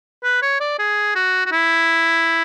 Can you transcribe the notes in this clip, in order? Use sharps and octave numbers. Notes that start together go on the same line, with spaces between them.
B4
C#5
D5
G#4
F#4
F#4
E4